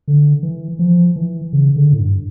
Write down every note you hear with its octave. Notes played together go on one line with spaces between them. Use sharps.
D3
E3
F3
E3
C#3
D3
A2
G2